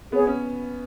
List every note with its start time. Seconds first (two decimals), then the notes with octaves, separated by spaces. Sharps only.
0.12 B3 G#4 C#5
0.27 C#4